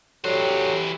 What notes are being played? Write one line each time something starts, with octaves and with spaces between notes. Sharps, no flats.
D3 E3 F#3 G4 C5